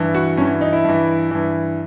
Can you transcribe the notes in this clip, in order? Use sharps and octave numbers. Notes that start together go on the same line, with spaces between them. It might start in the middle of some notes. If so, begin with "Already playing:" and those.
Already playing: G2 E3
F#4
G2 E3 C#4
D#4
E4
G2 E3
G2 E3